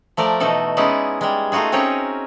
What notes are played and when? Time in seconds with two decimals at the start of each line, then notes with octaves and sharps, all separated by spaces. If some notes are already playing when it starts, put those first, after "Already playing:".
0.17 F3 A3 A#4 D5
0.40 B2 E3 D#4 F#4 A4
0.77 G#3 B3 C#4 D#4 E4 D5
1.21 G3 G#3
1.52 A3 D#4 F4 F#4 G#4
1.72 C4 C#4 D#4 F#4 A#4 C#5